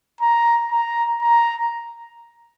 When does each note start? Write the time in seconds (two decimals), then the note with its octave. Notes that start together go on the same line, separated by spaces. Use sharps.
0.21 A#5
0.71 A#5
1.22 A#5